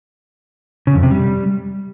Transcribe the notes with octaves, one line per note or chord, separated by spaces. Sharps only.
C#3
F2
C3
G3